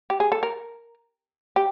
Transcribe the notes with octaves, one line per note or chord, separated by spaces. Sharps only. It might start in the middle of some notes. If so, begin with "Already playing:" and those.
G4
G#4
A4
A#4
G4